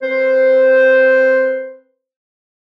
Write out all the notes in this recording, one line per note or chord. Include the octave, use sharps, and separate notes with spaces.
C4 B4 C5